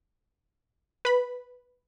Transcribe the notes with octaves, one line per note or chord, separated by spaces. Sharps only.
B4 B5